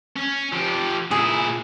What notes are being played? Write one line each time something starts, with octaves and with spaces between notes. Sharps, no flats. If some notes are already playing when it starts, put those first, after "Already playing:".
C#4
F3 G4
A#2 E4 G#4